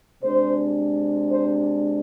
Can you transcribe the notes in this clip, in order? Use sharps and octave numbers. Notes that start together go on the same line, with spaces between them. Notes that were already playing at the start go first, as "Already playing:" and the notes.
C3 G#3 D4 C5
C5